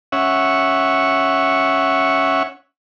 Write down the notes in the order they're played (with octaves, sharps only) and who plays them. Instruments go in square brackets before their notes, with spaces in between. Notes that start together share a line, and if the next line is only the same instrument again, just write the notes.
[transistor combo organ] C#4 C#5 E5 F#5